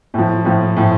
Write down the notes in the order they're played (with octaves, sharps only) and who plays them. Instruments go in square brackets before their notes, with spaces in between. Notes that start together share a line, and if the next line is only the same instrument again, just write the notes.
[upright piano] A2 F3
A2 F3
A2 F3